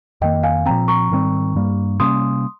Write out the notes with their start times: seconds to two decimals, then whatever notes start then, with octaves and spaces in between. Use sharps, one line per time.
0.21 F2 D#3 A#3 D#5 G5
0.43 F5 G#5
0.66 A#2 F3 C4 G5 A#5
0.88 A#5 C#6
1.11 G#2 D#3 G3 C4
1.55 G2 G3 A#3
2.00 C3 G3 A#3 C#4 C6 D#6